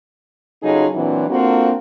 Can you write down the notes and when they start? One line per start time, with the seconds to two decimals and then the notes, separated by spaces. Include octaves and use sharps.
0.63 C#3 F#3 D#4 F4 G#4 A4
0.94 A#2 E3 F#3 C4 D4 E4
1.30 A#3 C4 D4 F4 F#4 A4